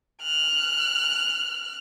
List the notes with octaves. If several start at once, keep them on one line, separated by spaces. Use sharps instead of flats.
F6 F#6